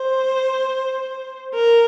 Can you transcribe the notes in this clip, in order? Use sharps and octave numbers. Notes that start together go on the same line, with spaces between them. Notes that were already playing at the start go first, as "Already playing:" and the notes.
Already playing: C5
A#4